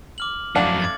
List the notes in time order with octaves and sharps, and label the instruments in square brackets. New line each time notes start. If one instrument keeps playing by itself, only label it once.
[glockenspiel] D6 F6 F#7
[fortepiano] A1 F5 F#5 [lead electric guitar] F2 F#3 [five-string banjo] D4 [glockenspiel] F#7
[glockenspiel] D6 G#6 A6